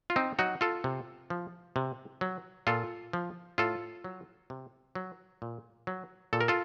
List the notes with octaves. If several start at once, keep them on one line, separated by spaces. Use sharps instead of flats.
F4
C4 D#4
F#3 D#4 F#4
F4 A4
C3
F3
C3
F#3
A#2 F4 A4
F3
A2 F4 A4
F#3
C3
F#3
A#2
F#3
A#2 A4
A#4
F4 A4